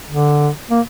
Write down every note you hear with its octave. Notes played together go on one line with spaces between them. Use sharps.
D3
A#3